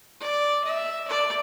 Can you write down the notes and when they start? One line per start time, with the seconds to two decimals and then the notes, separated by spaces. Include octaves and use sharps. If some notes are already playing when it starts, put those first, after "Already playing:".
0.20 D5
0.64 E5
1.08 D5